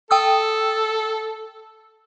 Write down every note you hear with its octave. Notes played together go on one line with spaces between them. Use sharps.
A4 G5 D#6 E6